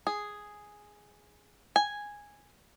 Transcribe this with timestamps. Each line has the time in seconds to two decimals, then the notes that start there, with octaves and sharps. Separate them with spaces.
0.07 G#4
1.76 G#5